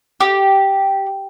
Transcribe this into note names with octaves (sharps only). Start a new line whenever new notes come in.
G4